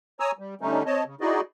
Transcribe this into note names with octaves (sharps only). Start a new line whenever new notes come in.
C#5 G#5 A#5 D#6 E6
G3
D3 G3 A3 C#4 D#4
C4 C#5 D#5 A5
C#3
D#4 E4 F#4 G#4 D5 D#5